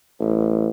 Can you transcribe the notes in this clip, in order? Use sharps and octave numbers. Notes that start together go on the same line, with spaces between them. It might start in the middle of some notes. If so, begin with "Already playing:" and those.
A1